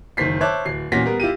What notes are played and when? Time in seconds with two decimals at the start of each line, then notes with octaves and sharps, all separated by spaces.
0.17 F#1 D#3 C5 B6 C7
0.41 C5 C#5 E5 A5 D6 F#6
0.65 D1 C7
0.92 E2 A#2 C#4 F#4 A#6 B6
1.05 G3 B3 A#4
1.20 E4 F4 G4 D#7